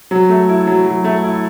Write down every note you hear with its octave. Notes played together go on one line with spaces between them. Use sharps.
F#3
A3
E4
F#3
F#3
A3
E4